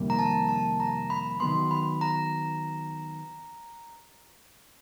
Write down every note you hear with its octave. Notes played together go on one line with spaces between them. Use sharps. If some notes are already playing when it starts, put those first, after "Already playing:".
Already playing: F2 C3 D#3 G3 A#3
A#5
A5
A5
A#5
B5
D#3 F#3 B3 C6
B5
A#5